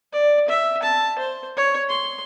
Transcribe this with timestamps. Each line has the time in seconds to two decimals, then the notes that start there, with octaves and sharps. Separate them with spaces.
0.13 D5
0.48 E5
0.83 A5
1.19 C5
1.57 C#5
1.89 C6